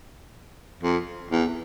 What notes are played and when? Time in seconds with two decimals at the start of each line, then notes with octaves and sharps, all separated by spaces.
0.83 F2
1.30 E2